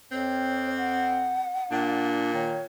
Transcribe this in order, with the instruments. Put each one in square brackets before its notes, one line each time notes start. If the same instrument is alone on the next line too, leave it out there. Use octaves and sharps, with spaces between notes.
[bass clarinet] F2 [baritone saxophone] C4 [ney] C#5
[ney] F#5
[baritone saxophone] A#2 [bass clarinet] D4
[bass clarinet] D#3 [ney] C#5